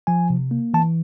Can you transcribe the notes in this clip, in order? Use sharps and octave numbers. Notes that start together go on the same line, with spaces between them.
F3 G#5
C3
A#3
E3 A5